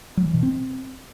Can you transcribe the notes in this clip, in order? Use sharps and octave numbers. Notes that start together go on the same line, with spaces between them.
F#3
E3
B2
C4